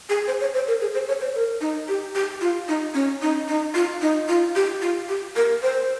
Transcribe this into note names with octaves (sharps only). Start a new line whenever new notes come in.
G#4
C5
C#5
C5
A#4
G#4
C5
C#5
C5
A#4
D#4
G4
G4
F4
D#4
C#4
D#4
D#4
F4
D#4
F4
G4
F4
G4
A#4
C5